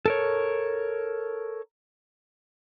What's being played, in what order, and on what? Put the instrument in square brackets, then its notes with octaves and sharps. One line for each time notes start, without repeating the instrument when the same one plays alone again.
[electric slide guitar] A4 A#4 C#5